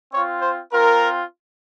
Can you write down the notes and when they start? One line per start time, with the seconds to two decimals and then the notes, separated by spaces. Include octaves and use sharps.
0.12 C4 F4 C#5
0.41 C5
0.72 C4 F4 A#4